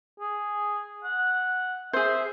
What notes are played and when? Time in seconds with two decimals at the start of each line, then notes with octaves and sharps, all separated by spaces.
0.20 G#4
1.04 F#5
1.93 G#4 C5 E5